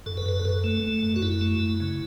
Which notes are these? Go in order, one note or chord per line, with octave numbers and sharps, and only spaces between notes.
F#2 A4
B4
F#2 A4
B4
F#2 A4
A3
A3
F#2
F#4
F#2 E4
A3
F#2
C#3